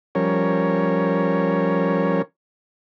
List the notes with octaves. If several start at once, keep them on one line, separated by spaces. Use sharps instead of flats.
F3 G3 C#4 A#4 C#5